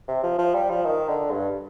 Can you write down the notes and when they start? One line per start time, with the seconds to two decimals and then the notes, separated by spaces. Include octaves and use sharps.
0.08 C3
0.23 F3
0.38 F3
0.55 G3
0.70 F3
0.85 D#3
1.08 D3
1.31 G2